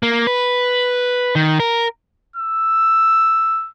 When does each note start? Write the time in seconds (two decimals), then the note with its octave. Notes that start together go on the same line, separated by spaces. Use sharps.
0.03 A#3
0.27 B4
1.36 D#3
1.60 A#4
2.36 E6